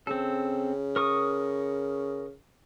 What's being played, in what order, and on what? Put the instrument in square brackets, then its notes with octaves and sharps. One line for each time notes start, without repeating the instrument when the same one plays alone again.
[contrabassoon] C#3 [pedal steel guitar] C4 A4
[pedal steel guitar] A#4 C#6 D#6